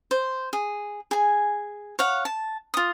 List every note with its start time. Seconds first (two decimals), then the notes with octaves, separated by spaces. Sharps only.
0.11 C5
0.53 G#4
1.11 G#4 G#5
1.99 C#5 F5 F#5
2.25 A5
2.74 F4 D#6